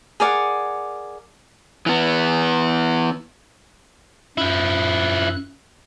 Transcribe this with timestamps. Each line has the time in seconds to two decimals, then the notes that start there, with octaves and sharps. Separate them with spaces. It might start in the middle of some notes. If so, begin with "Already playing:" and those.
0.20 G#4 A#4 D5 F#5
1.86 E3 B3
4.38 F#2 F3 E4 F#6